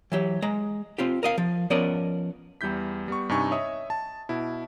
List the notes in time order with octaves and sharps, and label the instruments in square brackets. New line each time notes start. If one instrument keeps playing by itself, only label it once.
[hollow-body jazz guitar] E3 F#3 G4
G#3 A#5
C4 F4 G4
A#4 D#5 F5
F3
F3 B3 C#4 A#4 D5 D#5
[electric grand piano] E2 G3 E4 G6 B6
G3 B3 C#6
G2 C3 D#4 G#5 C#6
C#5 D#5 E5 D#6
A5
B2 E4